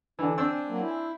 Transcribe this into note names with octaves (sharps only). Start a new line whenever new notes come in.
D3 E3 D4
C4 D4 G#5 E6
F#3 A#3
E4